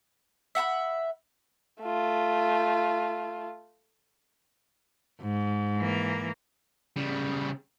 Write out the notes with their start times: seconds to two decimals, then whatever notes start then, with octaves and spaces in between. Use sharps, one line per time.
0.55 E5 F#5 A5 B5
1.82 A3 F4
5.21 G#2
5.78 E3 A#3
6.96 C#3 G3